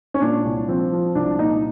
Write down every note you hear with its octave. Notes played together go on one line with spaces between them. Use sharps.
C#4
A#2 D4
C2
F3 C4
F3
C2 D4
A#2 D#4